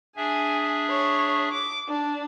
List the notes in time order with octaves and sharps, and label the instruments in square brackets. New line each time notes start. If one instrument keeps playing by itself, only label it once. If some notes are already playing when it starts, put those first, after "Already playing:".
[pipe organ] D4 G#4 E5 [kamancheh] G#5
[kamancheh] C#5
D6
D4